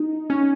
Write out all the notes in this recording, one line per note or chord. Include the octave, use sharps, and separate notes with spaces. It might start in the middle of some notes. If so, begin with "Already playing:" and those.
Already playing: D#4
C#4